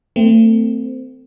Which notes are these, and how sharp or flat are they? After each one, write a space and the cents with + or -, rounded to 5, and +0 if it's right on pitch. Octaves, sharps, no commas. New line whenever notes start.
E3 +0 A3 +30 C4 -15